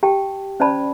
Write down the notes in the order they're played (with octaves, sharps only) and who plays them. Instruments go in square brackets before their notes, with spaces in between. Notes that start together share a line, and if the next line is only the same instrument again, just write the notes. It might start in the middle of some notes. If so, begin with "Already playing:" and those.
[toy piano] G4 G5 A5
C#4 C5 D5 A5 B5